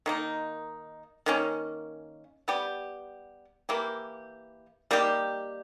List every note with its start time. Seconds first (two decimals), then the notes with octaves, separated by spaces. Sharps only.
0.06 D#3 A#3 D#4
1.26 D#3 A#3 C#4
2.48 G3 B3 G4
3.69 E3 A#3 E4 G4
4.91 G3 A#3 D#4 G4